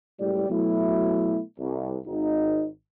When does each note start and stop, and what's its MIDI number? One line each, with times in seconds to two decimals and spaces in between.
0.20 0.49 30
0.20 0.49 45
0.20 0.49 55
0.20 0.49 67
0.20 0.49 74
0.50 1.40 47
0.50 1.40 54
0.50 1.40 57
0.50 1.40 64
1.59 1.96 36
2.07 2.67 32
2.07 2.67 63